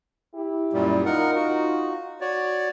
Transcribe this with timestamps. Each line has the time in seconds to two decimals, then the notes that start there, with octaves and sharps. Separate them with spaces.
0.35 E4 G4
0.73 F#2 A#2 G3
1.06 D#4 F4 A#4 F#5
1.35 F#4
2.21 F#4 C#5 D5